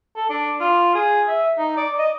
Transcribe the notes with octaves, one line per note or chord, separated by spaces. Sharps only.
A4
D4
F4
G#4
E5
D#4
D5
D#5